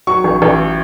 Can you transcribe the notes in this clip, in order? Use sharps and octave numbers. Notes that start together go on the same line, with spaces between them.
F#3 C#6
A1
A1